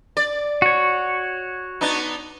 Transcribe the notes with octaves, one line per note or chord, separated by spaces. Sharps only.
D5
F#4 C#5
B3 D4 D#4